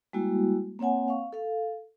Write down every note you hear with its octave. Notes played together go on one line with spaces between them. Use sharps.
G3 G#3 A#3 E4 F#4
A#3 C4 C#5 F#5 G#5
F5 C#6
A4 F5